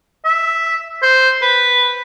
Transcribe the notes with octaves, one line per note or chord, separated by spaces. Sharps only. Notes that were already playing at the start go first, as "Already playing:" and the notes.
E5
C5
B4